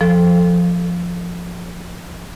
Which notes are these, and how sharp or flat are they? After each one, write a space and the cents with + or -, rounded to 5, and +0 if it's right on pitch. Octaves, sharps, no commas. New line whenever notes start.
F3 +0 A4 +0